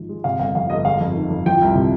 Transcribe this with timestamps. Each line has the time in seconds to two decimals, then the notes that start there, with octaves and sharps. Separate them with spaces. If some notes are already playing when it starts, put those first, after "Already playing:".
Already playing: G#1 G#2 F3
0.09 G#3
0.24 C3 F5
0.39 G1 F5
0.55 F2 F5
0.70 G1 D#5
0.85 G#3 F5
1.01 F2
1.16 D#3
1.30 F2
1.46 F3 G5
1.61 C2
1.75 C3